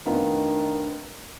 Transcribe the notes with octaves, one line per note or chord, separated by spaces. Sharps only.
F1 D#3 B3 D4 F4